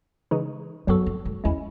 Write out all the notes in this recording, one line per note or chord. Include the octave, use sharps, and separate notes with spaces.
C#3 E3 G#3 D#4
F#2 F#3 B3 F#4 A4
F#2
G#2
E2 G#3 C#4 E4